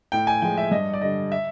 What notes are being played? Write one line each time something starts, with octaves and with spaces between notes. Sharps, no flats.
A2 G5
G#5
F3 G#3 G5
E5
G2 D#5
D5
D3 G3 D#5
E5